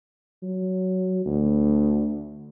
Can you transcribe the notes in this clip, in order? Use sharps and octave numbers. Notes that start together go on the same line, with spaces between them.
F#3
D2